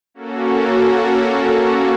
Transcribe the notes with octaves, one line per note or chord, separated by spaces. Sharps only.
A#3 C#4 F#4 A4